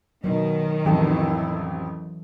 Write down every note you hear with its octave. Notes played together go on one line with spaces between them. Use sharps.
B2 D#3 F#3
A1 F2 C3 E3 F#3 E4 A4